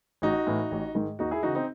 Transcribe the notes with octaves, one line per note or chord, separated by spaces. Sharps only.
A1 D#4 F#4
A2 E3
A1
G#2 D#3
D#2 D#4 F#4
E4 G#4
C#3 E3 D#4 F#4
C4 D#4